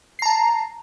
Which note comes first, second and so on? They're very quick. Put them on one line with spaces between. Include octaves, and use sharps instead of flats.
C7 A#5 A5